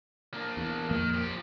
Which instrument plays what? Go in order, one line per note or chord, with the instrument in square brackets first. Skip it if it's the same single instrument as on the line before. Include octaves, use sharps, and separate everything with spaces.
[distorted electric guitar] A#3 D4
[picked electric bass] E2
[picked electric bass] A#1 F2 A#3 [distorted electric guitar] D#3
[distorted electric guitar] F3 G4